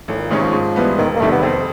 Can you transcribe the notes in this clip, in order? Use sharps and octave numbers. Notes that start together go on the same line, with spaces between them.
G#1 A2
A#2
G#2 C3 D#3 G#3 C#4
F3
G#2
E3 G3 B3
E1 D#3
A#3
E2 C3 D#3 G3 A3
B3
F2 C4